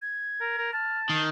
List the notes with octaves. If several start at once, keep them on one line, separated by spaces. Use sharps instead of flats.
G#6
A#4
A#4
A5 F6
D#3 C7